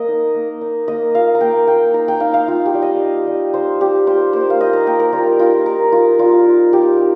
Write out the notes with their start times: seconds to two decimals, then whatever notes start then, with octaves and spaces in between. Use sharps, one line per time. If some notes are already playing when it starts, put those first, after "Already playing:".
Already playing: A#3 D#5
0.08 D#4
0.35 A#3
0.61 D#4
0.88 A#3 D#5
1.15 F4 F5
1.35 A#5
1.41 A#3 G5
1.67 F4 G5
1.94 D#4 A#5
2.08 G5
2.20 D#4 F5
2.34 F5
2.48 D#4 F4
2.66 G4
2.74 G3
2.82 D#5
3.01 D#4
3.27 G3
3.54 D#4 C5
3.81 G3 G4
4.07 F4 C5
4.33 A#3 C5
4.50 F5
4.60 F4 D#5
4.73 A#5
4.86 A#3 G5
5.00 A#4
5.12 G3 F4
5.39 D#4 F4
5.66 D#4 A#4
5.92 D#4 F4
6.19 G3 F4
6.46 D#4
6.72 G3 G4
6.99 D#4